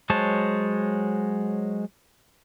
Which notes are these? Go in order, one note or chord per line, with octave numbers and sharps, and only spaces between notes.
F#3 G#3 C5 C#5 A5